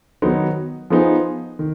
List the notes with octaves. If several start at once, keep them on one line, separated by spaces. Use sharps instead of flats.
D#3 F#3 B3 D#4
F3 B3 D#4 G#4
D#3